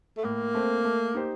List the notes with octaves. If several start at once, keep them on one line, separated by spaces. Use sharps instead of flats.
A3
A2 A#3
A3 C4
A3
D#4 G4 C5